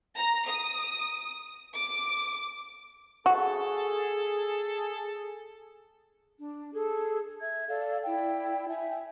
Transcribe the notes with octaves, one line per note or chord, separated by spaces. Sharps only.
A#5
D#6
D6
F#4 G#4 A4
D4
G#4 A4
E5 G#6
A4 D5 F5
E4 D5 G5
E5 G5 G#5